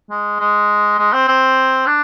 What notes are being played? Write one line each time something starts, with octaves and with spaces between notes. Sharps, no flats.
G#3
G#3
G#3
C4
C4
D4